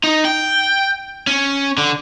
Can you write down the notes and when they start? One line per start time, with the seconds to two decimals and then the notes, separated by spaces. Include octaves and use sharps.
0.04 D#4
0.25 G5
1.27 C#4
1.78 D3